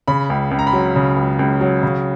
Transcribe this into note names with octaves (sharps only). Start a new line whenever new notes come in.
C#3 B5
C#2
C#2
A#5
B5
F#3
C#3
C#2
C#2
F#3
C#3